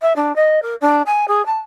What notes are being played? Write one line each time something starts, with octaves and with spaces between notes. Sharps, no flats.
E5
D4
D#5
A#4
D4
G#5
G#4
A5